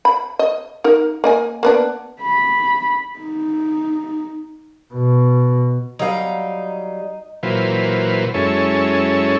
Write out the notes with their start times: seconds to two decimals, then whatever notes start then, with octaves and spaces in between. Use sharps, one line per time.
0.05 B5
0.39 D#5
0.84 D#4 A#4
1.24 A#3 D#5 G#5
1.63 A#3 B3 D4
2.22 B5
3.20 D#4
4.94 B2
5.99 F#3 G3 D#4 F5
7.43 A#2 E3 F#3 B4 C5 F5
8.34 F#2 G#3 C#4 E4 A4 C#5